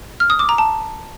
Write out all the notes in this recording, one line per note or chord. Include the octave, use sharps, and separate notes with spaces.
F6
D#6
D6
A#5
A5